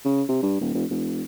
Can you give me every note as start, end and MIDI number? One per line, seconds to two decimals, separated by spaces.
0.05 0.23 49
0.29 0.39 48
0.43 0.57 43
0.60 0.71 27
0.74 0.85 29
0.90 1.23 29